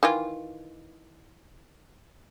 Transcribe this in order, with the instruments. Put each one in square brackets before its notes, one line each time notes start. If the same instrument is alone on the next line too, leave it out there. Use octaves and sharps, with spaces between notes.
[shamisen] D#3 E3 F4